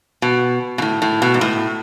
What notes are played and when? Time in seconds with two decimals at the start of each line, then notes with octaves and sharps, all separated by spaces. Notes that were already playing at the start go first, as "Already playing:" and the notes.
0.22 B2
0.78 B2
0.82 A2
1.02 A2
1.22 B2
1.34 G#2
1.41 A2